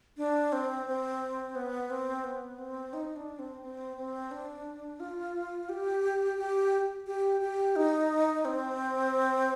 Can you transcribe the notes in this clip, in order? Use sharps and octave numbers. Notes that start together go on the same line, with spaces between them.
D4
C4
C4
B3
C4
B3
C4
D#4
D4
C4
C4
C4
D4
F4
G4
G4
G4
G4
D#4
C4